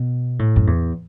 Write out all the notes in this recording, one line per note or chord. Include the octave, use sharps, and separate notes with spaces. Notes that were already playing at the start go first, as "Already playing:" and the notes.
Already playing: B2
A2
F#2
E2